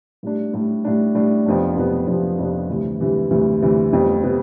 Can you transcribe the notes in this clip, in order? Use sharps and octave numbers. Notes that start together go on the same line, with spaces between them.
A2 G3 D4
A2 G3 D4
A2 G3 D4
A2 G3 D4
F2 C3 F3 B3 D4
F2 C3 F3 B3 D4
F2 C3 F3 B3 D4
F2 C3 F3 B3 D4
D2 C3 E3 G3
D2 C3 E3 G3
D2 C3 E3 G3
D2 C3 E3 G3
F1 F2 C3 G3 B3
C3 G3 B3